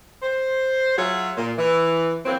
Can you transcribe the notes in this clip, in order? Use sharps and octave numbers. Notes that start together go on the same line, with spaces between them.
C5
F#3 F4 F#4 G#4 C#5 E5
A#2
E3
E3 F#3 A#3 C4